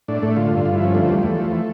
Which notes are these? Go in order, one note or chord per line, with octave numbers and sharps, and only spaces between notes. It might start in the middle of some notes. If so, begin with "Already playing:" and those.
A2 D4
A2 A3
D3 F4
G2
G2 F4
E4
F3
C#4
D3 A3
E2 G3
E2 A3
F3
E3